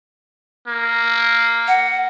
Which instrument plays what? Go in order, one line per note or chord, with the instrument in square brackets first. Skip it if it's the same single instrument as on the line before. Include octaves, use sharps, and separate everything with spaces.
[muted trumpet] A#3
[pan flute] F#5